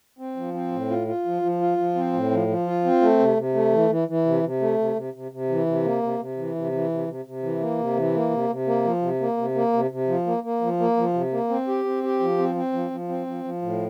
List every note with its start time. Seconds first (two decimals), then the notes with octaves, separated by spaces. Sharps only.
0.19 C4
0.36 F3
0.54 C4
0.71 A2
0.89 F4
1.07 F4
1.25 F3
1.42 F3
1.61 F4
1.78 F3
1.95 C4
2.13 A2
2.31 F3
2.48 F3
2.66 F4
2.84 C4
3.01 A3
3.19 C3
3.37 C3
3.54 A3
3.73 E3
3.90 E3
4.08 E3
4.26 C3
4.43 C3
4.61 A3
4.79 C3
4.96 C3
5.14 C3
5.32 C3
5.49 E3
5.66 C3
5.84 A#3
6.02 C3
6.20 C3
6.37 E3
6.55 C3
6.72 E3
6.90 C3
7.08 C3
7.25 C3
7.43 E3
7.61 A#3
7.78 C3
7.96 E3
8.14 A#3
8.31 C3
8.50 C3
8.67 A#3
8.84 F3
9.02 C3
9.20 A#3
9.37 C3
9.55 A#3
9.73 C3
9.91 C3
10.08 F3
10.26 A#3
10.44 A#3
10.61 F3
10.80 A#3
10.97 F3
11.14 C3
11.32 A#3
11.49 C4
11.68 G4
11.85 C4
12.03 G4
12.20 F3
12.38 C4
12.55 C4
12.73 F3
12.90 F3
13.09 C4
13.27 F3
13.44 F3
13.62 A2